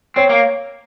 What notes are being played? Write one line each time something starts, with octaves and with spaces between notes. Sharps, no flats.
C4 C#5
A#3